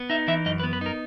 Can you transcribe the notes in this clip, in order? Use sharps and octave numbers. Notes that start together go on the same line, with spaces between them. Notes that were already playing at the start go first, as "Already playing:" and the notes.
Already playing: B3
D#4 E5
E3 E5
F#2 D#5
B4
B3
B4
D#4 A#4